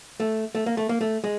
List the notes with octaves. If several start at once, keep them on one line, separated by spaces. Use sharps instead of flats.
A3
A3
A#3
A3
A#3
A3
G#3